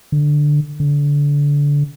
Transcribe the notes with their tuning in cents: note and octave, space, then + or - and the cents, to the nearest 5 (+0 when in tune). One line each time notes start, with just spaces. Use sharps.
D3 +5
D3 -25